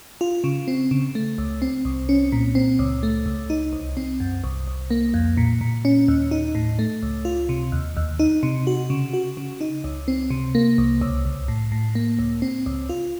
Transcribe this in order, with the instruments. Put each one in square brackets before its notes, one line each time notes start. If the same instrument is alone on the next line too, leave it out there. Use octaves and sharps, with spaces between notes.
[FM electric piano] F4
C#3
C4
C#3
A3
C#2
C4
C2
C#4
A#2
C4
C#2
A3
C#2
D#4
C2
C4
F#2
C2
C2
A#3
F2
A#2
A#2
C#4
D#2
D#4
A2
A3
C#2
F4
C3
D#2
D#2
D#4
C3
F#4
C#3
F#4
C#3
D#4
C#2
C4
C3
A#3
C2
C#2
C#2
A2
A2
A#3
C#2
C4
C#2
F4